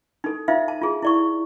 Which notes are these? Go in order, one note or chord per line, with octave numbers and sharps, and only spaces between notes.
D#4 A4
D#4 F4 C5 E5 F5
A5
F4 G#4
E4 D5 C#6